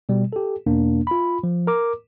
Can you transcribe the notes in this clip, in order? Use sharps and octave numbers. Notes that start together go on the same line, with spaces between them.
B2 G3
G4 A4
E2 B2 A#3 D4
F4 B5
F3
A#4 D6